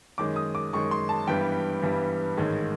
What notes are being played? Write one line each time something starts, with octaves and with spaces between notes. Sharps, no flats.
F#2 D#3 G#3 D6
D#6
D6
F#2 D#3 G#3 C#6
C6
A5
G2 E3 G3 B3 G5
G2 E3 G3 B3
A1 G#2 D#3 G#3